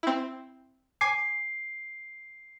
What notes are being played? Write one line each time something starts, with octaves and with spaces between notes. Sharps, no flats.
C4 E4
G#5 D6 C7